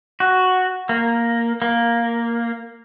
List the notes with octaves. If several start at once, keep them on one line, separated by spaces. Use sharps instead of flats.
F#4
A#3
A#3